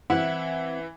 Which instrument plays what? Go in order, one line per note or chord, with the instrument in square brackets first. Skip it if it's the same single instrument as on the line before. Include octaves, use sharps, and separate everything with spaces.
[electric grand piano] E3 E5 [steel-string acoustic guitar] C4 F#5 [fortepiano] E4